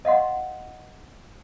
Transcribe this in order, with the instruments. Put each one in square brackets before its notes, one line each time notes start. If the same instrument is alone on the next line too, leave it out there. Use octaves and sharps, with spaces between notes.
[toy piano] D#5 F5 F#5 C6